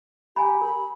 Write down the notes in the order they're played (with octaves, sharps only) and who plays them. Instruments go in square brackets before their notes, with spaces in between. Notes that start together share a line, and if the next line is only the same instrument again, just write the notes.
[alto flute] G4 [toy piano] G#5 A#5 B5
[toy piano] A#4 [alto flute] B5